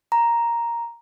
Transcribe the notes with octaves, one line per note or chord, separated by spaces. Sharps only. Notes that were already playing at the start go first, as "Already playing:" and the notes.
A#5